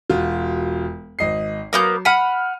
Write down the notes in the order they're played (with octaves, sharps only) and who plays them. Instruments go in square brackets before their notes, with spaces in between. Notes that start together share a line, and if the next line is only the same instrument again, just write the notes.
[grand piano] E1 F4 F#4
G#1 D#5 C7
[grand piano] F#3 [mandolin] A#3 B3 G6
[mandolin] F#5 B5 [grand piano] F6 D#7